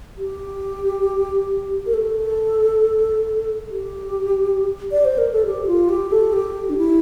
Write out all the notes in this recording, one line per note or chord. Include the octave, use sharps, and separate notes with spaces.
G4
A#4
A4
G4
D5
C5
A#4
A4
G4
F4
G4
A4
G4
D4
E4